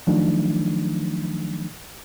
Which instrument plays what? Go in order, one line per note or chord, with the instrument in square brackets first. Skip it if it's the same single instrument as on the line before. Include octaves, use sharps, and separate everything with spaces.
[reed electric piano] D#3 F3 F#3 A3 D4 D#4